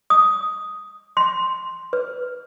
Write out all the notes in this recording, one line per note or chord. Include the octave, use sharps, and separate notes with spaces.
D#6
C6
B4